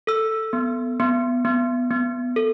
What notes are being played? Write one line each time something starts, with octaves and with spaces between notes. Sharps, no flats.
A4 E6
B3
B3
B3
B3
A4